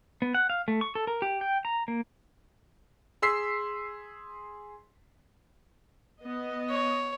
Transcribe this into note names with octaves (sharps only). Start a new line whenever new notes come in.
B3
F#5
F5
A3
C#6
A4
A#4
G4
G5
A#5
A#3
G#4 C6 E6 B6 C7
B3 D#5
C#5